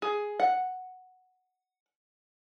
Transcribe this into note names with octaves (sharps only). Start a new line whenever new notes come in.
G#4
F#5